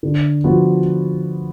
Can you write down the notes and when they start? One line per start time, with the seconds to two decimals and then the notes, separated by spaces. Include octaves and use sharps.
0.03 D3
0.44 F3 B3 F#4